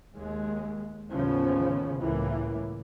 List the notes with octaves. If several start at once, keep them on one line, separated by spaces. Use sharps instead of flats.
D#2 G#3
A1 D#2 C#3 F3 B3 C#4
C#2 A2 E3 A#3